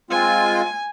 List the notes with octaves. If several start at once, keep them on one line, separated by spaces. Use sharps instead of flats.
G#3 C4 F4 G#5